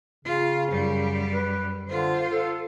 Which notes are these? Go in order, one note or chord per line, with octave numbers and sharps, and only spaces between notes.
C#3 F4
F#2 G3
B4
D3 F4 C5
A4